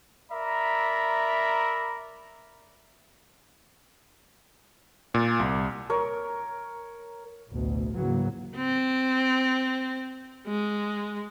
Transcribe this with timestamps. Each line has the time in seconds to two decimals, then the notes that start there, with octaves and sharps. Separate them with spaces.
0.31 A#4 D5 E5 A#5 B5
5.14 A#2
5.40 C2
5.90 A#4 C#5
7.50 A1 D2 B2
7.93 G#2 C#3 E3 F#3 A#3
8.56 C4
10.47 G#3